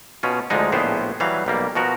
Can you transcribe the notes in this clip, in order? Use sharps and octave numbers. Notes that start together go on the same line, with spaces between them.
B2 C#4 F4
D2 D3 F3 G#3 D#4
A#1 A2 B3 G4 G#4 C5
E3 F#3 G3 F5
B1 G3 A#3
B2 F3 F#4 A#4